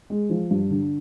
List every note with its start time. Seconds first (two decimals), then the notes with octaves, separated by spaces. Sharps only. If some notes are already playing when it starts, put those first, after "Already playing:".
0.10 G#3
0.30 F3
0.51 G2
0.70 D3